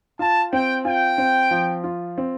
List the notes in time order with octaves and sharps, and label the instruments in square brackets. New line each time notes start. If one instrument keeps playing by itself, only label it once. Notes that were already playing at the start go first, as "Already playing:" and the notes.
[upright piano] F4 [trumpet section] A5
[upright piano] C4 [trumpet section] G5
[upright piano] F4 [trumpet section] G5
[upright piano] C4
F3
F4
C4